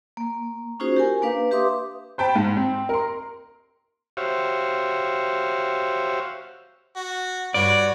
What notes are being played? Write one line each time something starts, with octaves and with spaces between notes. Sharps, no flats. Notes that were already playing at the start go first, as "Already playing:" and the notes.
A#3
C#4 D#4 F4 F#4 G#4 C5
G4 A#4 G#5
A#3 D4 B4 F5
G4 B4 E5 C6 D6 D#6
C5 G5 A5 B5
G#2
C4
A#4 C6
F#4 G4 C5 C#5 E5 F5
F#4
G2 F#4 B4 C#5 D5